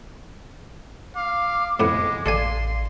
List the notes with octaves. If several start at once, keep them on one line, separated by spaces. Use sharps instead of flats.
F5 D6
F2 A2 G#3 B3 D6
A1 A4 D5 F5 G#5 C6